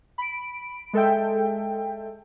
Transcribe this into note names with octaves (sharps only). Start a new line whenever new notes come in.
B5 D7
G#3 A4 E5 G5